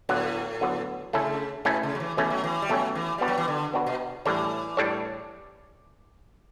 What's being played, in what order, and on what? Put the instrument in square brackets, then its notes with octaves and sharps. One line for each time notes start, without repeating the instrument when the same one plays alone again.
[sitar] A2 [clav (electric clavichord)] D3 F#3 B3
[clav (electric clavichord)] D3 F#3 B3
[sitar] C#3 [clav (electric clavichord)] A3 C#4 E4 A4
[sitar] B2 [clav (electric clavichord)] A3 C#4 E4 A4
[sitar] C#3
F#3
E3
[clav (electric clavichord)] B2 A3 C#4 [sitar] E3
[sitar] F#3
E3
G3
[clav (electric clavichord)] B2 A3 C#4 [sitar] F#3
[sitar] E3
[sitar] G3 [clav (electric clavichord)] B3 D4 F#4 B4
[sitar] F#3
E3
D3
[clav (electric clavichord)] B3 D4 F#4 B4
[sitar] B2
[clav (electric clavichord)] A2 G3 D4 A4 C#5 [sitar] E3
[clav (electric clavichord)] A2 G3 D4 A4 C#5